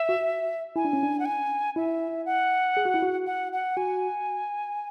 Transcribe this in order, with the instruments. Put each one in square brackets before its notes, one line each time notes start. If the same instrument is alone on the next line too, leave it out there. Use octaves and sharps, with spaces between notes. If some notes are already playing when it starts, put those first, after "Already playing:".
Already playing: [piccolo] E5
[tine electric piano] F#4
[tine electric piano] E4 [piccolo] G#5
[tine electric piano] D4
C#4
D4
[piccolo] F#5
G#5
[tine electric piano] E4 [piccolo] E5
[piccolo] F#5
[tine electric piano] G#4
F#4
E4
F#4
[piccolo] F#5
F#5
[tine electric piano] F#4 [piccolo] G#5